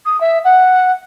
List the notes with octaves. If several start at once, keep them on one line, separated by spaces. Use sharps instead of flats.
D#6
E5
F#5